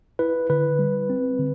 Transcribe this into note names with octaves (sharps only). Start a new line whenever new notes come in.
E4 B4
D3 B4
G3
C4
D3